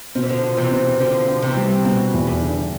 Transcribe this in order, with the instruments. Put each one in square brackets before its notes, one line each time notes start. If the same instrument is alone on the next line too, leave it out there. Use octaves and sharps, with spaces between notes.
[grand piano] B2 [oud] F3
[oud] E3
D3 F3
[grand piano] F4
[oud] C3 E3
[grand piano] B2
[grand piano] B2 [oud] D3 F3
[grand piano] C4
[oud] C3 E3
[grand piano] G3
[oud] B2 [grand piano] B3
[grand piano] E2
[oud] G2
[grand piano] D3